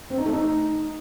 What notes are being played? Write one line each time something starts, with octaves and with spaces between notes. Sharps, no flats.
C4
D#4
A3
D#4